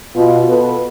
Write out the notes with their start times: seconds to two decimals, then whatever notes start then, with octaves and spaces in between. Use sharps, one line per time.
0.15 B2 F4
0.48 B3 A4 B4